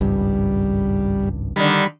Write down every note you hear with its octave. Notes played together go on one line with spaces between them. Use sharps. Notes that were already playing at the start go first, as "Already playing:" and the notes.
G#1 C#2 G2 G3
D3 D#3 G3 B5